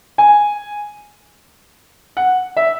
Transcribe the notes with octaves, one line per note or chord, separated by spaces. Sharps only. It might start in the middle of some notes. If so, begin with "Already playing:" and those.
G#5
F#5
E5